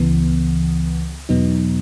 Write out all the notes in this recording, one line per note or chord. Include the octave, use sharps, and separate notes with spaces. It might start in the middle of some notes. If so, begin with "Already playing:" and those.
Already playing: C#2 C#3 E3 B3
E2 B2 F#3 B3 D#4